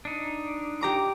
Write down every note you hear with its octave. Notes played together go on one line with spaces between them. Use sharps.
D4 D#4
G4 A#5 D6